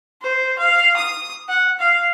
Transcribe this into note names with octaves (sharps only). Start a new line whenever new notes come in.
C5
F5
D#6
F#5
F5